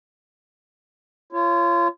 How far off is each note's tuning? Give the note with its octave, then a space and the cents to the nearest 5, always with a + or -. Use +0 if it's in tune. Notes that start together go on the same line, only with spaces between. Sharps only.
F4 -30 C#5 -10